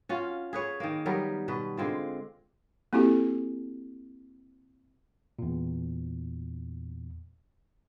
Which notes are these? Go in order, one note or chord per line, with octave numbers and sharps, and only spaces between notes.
C#4 F4 F#4
G#4 B4 C#5
D#3 A#3
F#3 G3 B3 A#4
B2 B4
D3 G#3 C4 F4
A#3 C4 E4 F#4 G4 A4
E2 A#2